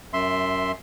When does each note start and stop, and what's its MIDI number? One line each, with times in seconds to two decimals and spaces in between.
0.13 0.72 42
0.13 0.72 76
0.13 0.72 84